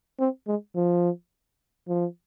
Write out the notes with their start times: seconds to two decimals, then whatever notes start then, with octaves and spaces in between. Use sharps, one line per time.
0.20 C4
0.47 G#3
0.76 F3
1.88 F3